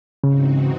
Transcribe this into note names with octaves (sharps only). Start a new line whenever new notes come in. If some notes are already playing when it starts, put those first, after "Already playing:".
G#2 C#3 E3 C4 D#4 F#4